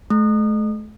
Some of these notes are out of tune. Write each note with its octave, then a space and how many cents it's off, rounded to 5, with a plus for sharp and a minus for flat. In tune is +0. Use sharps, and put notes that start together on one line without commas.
A3 -40